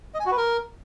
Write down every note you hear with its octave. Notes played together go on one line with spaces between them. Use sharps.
D#5
G#5
F#4
B4
A#4